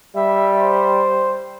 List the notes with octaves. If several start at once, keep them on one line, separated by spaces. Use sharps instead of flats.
G3 E5
C5